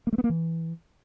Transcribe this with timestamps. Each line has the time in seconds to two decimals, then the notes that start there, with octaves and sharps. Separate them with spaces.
0.07 A#3
0.13 A3
0.18 B3
0.24 A#3
0.30 E3